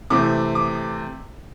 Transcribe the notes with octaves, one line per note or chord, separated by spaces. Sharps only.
C3 E3 A3 C4 D6
D6